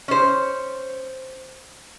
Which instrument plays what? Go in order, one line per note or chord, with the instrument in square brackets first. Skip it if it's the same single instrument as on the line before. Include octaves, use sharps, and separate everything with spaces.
[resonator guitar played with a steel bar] C#4 C5